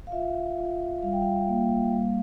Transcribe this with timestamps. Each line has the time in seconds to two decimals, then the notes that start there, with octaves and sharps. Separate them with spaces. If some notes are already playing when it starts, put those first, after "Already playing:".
0.07 F5
0.12 F4 E5
0.57 F4
1.03 G3 F5
1.13 G5
1.22 F5
1.48 A#3
1.93 G3